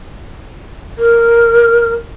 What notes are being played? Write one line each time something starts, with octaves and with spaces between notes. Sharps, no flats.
A#4